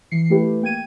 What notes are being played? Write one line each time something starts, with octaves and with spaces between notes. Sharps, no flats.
E3 C7 C#7
A3 E4 G4 B4
A#3 G5 G#6 D#7